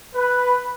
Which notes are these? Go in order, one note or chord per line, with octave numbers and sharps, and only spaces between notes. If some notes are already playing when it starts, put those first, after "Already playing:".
B4